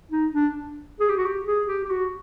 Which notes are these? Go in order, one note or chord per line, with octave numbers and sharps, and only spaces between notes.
D#4
D4
G#4
G4
F#4
G4
G#4
G4
G4
F#4